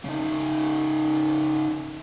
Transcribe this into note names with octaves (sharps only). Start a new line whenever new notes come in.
C#3 D#4